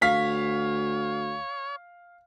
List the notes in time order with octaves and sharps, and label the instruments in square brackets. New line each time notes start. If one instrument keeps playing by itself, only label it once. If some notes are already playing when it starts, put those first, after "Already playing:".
[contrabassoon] D2 [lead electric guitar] C#5 [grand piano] F5 B6